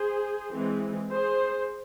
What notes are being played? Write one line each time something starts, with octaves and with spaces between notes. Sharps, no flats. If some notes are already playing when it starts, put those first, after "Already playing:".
Already playing: G#4 C5
E3 G#3 C4
G#4 C5